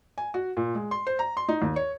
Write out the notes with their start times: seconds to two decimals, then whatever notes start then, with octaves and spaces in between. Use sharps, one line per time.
0.18 G#5
0.34 F#4
0.57 A#2
0.75 G#3
0.91 C6
1.07 C5
1.19 A#5
1.37 C6
1.48 D#4
1.62 D#2
1.76 C#5